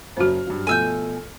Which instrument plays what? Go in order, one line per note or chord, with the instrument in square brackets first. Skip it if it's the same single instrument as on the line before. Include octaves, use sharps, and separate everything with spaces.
[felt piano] F#1 F#3 F6 [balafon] F#4 C5
[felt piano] G2 F#3
[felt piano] B2 F3 A3 [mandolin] G#5 E6 G6